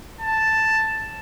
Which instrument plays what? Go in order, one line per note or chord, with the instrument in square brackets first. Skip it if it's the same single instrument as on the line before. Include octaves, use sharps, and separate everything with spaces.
[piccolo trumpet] A5